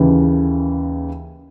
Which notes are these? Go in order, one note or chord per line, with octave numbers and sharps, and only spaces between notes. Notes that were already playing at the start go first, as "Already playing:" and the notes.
Already playing: D#2 C#3 E3